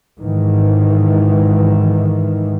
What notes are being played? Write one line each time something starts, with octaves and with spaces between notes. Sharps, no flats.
G#2 D#3 E3